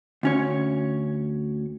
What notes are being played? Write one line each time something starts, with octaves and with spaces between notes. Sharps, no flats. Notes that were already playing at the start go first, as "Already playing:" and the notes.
D2 C#4 C#5